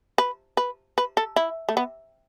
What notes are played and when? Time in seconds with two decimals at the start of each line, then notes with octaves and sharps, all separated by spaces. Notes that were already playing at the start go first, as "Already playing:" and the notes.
0.18 B4
0.57 B4
0.98 B4
1.17 A4
1.36 E4
1.69 A3
1.77 B3